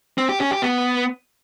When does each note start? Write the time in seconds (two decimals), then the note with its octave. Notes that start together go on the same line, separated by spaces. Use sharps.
0.18 C4
0.29 G4
0.40 C#4
0.51 G4
0.62 B3